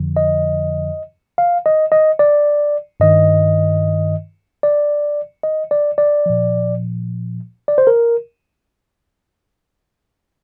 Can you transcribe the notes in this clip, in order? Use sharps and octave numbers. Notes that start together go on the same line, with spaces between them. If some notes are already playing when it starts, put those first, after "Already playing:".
Already playing: F2 D3 F3
D#5
F5
D#5
D#5
D5
G2 D#3 D#5
D5
D#5
D5
D5
A#2 F3
D5
C5
A#4